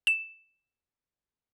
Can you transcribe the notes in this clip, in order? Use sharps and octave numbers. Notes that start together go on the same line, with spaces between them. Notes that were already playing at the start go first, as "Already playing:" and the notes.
E7